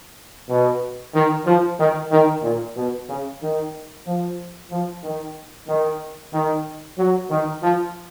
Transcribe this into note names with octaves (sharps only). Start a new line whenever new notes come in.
B2
D#3
F3
D#3
D#3
A#2
B2
C#3
D#3
F3
F3
D#3
D#3
D#3
F#3
D#3
F3